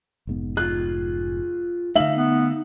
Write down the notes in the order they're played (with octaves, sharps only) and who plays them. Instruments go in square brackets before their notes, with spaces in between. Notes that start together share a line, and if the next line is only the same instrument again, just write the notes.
[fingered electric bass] F1 G#2 B3
[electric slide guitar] F4 G#4 [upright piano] F#6
[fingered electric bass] D3 A3 [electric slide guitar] D#4 [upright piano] E5 F5 F#7
[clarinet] B3